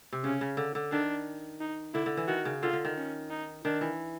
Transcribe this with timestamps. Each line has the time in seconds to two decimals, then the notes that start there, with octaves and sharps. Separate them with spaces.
0.13 C3
0.24 C#3 C#4
0.41 C#3
0.57 D3
0.75 D3
0.92 D#3 D4
1.60 D#4
1.94 D3 E4
2.06 D3
2.17 E3
2.28 D#3 F#4
2.45 C#3
2.62 D3 F4
2.73 D3
2.85 D#3
2.97 C#4
3.30 D#4
3.65 D#3 D4
3.81 E3